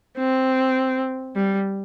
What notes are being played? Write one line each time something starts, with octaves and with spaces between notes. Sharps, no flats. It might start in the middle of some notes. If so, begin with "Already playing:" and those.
C4
G3